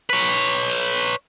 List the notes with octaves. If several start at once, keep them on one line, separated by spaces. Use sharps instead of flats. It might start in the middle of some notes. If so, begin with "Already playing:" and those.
B4 C#5